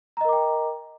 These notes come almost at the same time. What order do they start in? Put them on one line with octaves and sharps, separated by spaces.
A#5 D#5 A#4 D6 G5